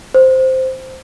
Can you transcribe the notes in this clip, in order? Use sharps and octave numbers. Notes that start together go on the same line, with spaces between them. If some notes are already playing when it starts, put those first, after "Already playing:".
C5